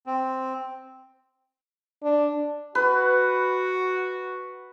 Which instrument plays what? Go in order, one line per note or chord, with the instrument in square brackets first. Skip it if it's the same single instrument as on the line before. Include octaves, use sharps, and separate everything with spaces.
[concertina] C4
[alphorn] D4
[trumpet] F#4 [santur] B4